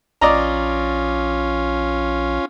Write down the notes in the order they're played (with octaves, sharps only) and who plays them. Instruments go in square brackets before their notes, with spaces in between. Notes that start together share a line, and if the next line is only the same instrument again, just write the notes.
[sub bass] A#1 [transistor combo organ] C#4 F4 [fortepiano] D5 D#5 A#5